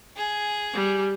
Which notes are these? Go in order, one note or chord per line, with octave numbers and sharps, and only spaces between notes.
G#4
G3